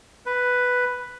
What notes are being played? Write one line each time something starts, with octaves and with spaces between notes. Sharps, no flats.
B4